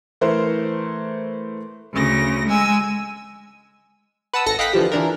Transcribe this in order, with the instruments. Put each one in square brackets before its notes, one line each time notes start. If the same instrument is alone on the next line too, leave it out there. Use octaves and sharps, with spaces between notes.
[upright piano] E3 A3 A#4 C5
[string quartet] D2 C#3 A#6
G#3 G#5 E6
[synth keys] B4 F#5 A5 D#6 E6
G#1 A4 A#6 C#7
D#5 F5 G5 B5 F#6 B6
D3 E3 F3 G4
E3 D4 A#4